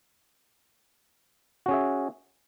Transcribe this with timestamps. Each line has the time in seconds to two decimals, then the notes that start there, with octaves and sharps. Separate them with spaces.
1.66 F#4
1.68 C#4
1.71 G#4
1.73 E5